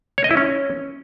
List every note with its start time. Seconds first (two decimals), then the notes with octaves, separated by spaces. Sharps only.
0.18 C#5
0.24 D#5
0.31 E4
0.37 C#4